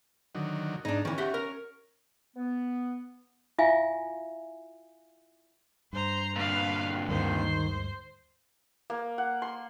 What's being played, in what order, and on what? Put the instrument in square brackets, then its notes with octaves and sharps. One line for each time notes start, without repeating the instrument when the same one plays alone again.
[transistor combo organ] D3 D#3 F#3
[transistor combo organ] G#2 [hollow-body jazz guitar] D4 D#4
[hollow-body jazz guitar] D#3 E3 [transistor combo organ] C#4
[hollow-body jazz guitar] G4 E5 F#5
A#4
[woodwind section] B3
[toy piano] E4 F4 E5 F5 G#5
[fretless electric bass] G2 [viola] C5 A#5
[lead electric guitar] A#2 D3 [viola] B4 F5
[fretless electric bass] D2 G2 G#3 [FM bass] D#3 [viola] C5
[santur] A#3
F#5
C6